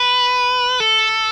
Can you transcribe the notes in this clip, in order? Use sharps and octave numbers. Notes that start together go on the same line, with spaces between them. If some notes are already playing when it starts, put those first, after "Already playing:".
Already playing: B4
A4